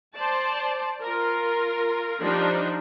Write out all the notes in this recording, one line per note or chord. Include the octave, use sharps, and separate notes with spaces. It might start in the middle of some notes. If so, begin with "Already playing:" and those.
C5 D5 A5
F4 A#4
F3 G3 D4 D#4